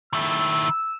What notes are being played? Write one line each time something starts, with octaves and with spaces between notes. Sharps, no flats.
D#3 E4 E6